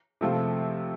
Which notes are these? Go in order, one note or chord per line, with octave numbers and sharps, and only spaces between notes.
C3 F3 A3 C4 F4